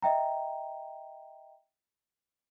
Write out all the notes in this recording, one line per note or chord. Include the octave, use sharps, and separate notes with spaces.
D#5 E5 G5 A#5